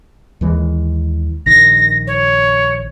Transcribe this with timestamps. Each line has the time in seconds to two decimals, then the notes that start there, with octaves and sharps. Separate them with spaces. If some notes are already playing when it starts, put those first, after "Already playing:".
0.41 D#2 E3 G#3
1.46 A#1 D#3 A#6
2.07 C#5